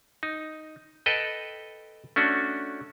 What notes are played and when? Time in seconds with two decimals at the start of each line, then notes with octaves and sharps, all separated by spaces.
0.23 D#4
1.06 A4 B4 D#5 G5
2.16 A3 C#4 D4 F#4